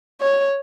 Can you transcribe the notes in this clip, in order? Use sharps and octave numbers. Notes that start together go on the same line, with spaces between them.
C#5